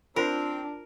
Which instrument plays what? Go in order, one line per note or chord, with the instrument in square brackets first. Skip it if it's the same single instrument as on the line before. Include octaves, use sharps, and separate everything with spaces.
[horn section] C4 [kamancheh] D4 [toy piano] F4 C5 [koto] A#4